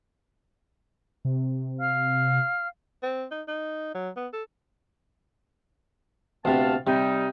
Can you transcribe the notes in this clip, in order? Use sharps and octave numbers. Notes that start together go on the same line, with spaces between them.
C3
F5 F6
C4
D#4
D#4
F#3
B3
A4
D2 C3 B3 F5 A5
C3 G3 D#4